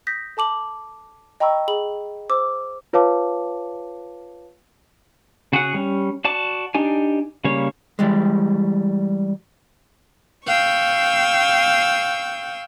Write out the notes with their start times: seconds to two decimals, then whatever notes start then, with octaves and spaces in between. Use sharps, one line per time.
0.07 D#6 G6 A#6 B6
0.37 A4 A5 D6 F#7
1.40 D#5 G5 A#5 B5 C#6 E6
1.68 G#4 B5 F#7
2.30 C5 D6 E6
2.93 F4 B4 C#5 F5 A5 D6
5.52 C#3 F#4 G#4 F#5
5.75 G3 C#4
6.25 F#4 D5 A5 D6
6.74 D4 D#4 G4 G#5
7.44 C#3 G3 A#3 C#5
7.99 E3 G3 G#3
10.45 F5 G5 C#6 E6